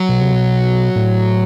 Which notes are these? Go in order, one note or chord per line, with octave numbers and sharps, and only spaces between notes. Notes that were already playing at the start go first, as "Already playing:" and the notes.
Already playing: F#3
B2
C3
B2
A2